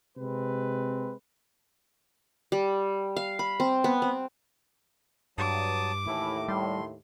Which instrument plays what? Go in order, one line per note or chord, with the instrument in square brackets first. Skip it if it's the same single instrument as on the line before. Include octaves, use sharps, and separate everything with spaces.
[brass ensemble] C3 G#3 C4 B4
[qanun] G3
F5
B5
C4
B3
C4
[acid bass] G2 [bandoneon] F#3 A5 D#6 [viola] D6
[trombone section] D#2 A2 [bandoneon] E3 E4
[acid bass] G3 [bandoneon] C6